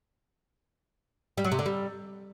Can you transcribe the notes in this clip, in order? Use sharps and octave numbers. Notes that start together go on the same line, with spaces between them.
G3
F#3
C3
D3
G3